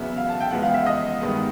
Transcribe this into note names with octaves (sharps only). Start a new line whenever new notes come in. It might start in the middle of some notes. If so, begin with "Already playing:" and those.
Already playing: E2 C#3 F#3 B3 E5
F5
A5
G5
E2 C#3 F3 G#3 B3 F#5
F5
E5
D#5
G2 D#3 G#3 B3